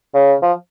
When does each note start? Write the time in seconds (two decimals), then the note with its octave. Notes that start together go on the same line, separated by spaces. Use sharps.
0.14 C#3
0.42 F3